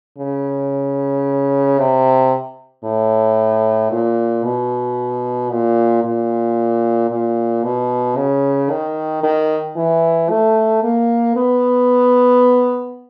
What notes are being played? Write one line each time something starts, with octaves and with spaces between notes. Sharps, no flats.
C#3
C3
A2
A#2
B2
A#2
A#2
A#2
B2
C#3
D#3
D#3
E3
A3
A#3
B3